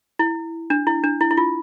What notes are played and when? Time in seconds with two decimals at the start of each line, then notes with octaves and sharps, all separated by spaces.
0.19 E4
0.70 D4
0.87 E4
1.04 D4
1.21 E4
1.31 E4
1.37 F4